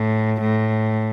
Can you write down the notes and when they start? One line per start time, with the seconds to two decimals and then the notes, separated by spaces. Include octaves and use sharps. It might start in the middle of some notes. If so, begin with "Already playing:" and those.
Already playing: A2
0.41 A2